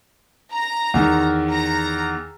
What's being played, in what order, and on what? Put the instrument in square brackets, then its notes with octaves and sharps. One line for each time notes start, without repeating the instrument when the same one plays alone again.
[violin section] A#5
[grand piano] E2 D#3
[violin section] A#5